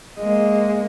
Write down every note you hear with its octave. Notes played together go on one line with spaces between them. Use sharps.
G#3 A#3 D#5